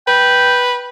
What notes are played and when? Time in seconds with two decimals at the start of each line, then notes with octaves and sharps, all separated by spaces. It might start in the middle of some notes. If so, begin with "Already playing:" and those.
0.07 B4 G5